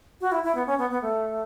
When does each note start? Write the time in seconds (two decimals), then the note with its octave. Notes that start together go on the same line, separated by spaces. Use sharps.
0.21 F#4
0.32 E4
0.44 E4
0.55 B3
0.66 C#4
0.78 B3
0.90 B3
1.02 A3